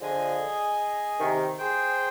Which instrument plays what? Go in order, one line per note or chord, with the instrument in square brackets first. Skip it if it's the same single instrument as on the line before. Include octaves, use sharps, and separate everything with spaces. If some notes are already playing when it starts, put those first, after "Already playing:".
[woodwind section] D3 F3 [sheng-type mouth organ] G#4 D#5 G#5
[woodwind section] C3 D#3
[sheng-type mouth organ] G#4 C5 G5